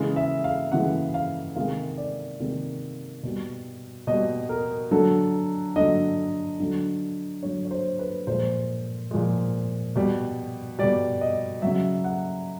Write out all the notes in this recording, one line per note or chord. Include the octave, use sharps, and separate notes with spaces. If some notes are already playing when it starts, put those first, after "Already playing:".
Already playing: C#3 E3 G#3
E5
F5
C#3 E3 G#3 F#5
F5
C3 D#3 G#3 F5
D5
C3 D#3 G#3
B2 G3
B2 G3 D#5
A#4
D3 F#3 A4
D3 F#3 D#5
D3 F#3
D3 F#3 C#5
C#5
C5
B4
A#2 F3 G#3 C5
A#2 F3 G#3
B2 G3
B2 G3 D5
D#5
C#3 F#3 E5
F#5